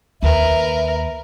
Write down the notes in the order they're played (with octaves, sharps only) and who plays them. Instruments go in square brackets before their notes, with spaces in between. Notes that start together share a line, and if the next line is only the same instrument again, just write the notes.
[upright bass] D#2 [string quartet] A#4 B4 [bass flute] E5